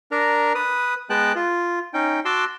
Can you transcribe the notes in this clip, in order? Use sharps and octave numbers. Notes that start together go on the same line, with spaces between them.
D4 A#4 A#5
B4 D#6
G#3 B3 G5 A5 F#6
F4
C#4 D#4 G5
F#4 A5 C6 D6 E6